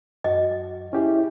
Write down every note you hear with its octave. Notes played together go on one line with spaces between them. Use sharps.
F#2 F#4 D#5
C#4 E4 G4 G#4